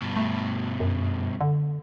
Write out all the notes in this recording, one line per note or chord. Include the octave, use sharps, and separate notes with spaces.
G2 B2
A3
F#2
D3